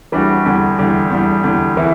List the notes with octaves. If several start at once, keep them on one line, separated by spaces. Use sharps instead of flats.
E3 G3 D4 F#4
E2 D3 G3
E2 D3 G3
E2 D3 G3
E2 D3 G3
E3 B3 E4